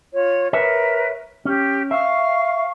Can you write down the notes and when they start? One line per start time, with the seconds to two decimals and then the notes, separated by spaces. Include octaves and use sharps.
0.13 F4 C#5
0.53 A#4 B4 C#5 E5
1.45 C#4 G4
1.91 E5 F5 C#6